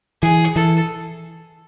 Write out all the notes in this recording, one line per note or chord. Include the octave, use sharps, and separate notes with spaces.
E3 G#4
E3 A4